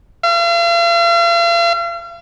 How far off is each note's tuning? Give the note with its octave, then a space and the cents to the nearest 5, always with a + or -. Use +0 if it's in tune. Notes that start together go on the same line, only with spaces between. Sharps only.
F5 -40